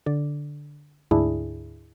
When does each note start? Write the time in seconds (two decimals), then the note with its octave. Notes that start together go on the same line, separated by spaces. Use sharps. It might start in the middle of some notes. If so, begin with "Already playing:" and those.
0.06 D3 D5
1.11 D2 G#2 D4 E4 G#4